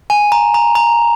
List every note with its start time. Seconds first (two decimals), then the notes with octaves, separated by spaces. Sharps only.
0.10 G#5
0.32 A#5
0.54 A#5
0.75 A#5